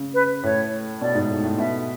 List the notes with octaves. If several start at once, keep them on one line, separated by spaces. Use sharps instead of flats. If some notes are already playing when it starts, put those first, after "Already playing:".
Already playing: C#3
B4
A2 C#5
B2 D5
G#2
A2
A2
B2 E5